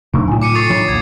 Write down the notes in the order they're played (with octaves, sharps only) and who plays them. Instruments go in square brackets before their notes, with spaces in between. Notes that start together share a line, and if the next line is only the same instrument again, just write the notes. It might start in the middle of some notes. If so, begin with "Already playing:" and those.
[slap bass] C3 A3 C4 [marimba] F#3 D4 D#4
[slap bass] A2 [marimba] F4 G#5
[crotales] D6 C#7 D#7
[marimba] A4 C#6 [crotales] D#6 A6 C7
[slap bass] D#3 F#3 D4 [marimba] C#5
[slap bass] A#1 D#2 [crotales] G#6